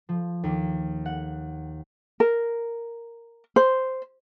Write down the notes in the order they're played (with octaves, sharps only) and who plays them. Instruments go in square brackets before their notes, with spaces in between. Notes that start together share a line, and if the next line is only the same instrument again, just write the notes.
[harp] F3
D#2
F#5
[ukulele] A#4
C5